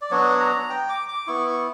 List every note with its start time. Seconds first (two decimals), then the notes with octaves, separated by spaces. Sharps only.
0.02 D5
0.11 F#3 B3 D4 F#4 C#5
0.40 A#5
0.69 G5
0.89 D6
1.08 D6
1.27 B3 E4 C#6
1.47 C#6